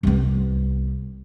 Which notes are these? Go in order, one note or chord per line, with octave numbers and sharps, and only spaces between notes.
C2 B3